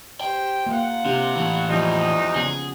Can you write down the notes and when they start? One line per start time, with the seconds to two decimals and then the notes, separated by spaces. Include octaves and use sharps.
0.21 G4 C5 G5
0.66 A#3 F4 F#5
1.05 C3 D4 G4
1.35 A2 E3
1.70 E2 F3 G3 D4 D#4 C5
2.36 C#3 B3 G#4